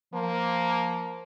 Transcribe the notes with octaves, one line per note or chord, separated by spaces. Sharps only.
F3 A#3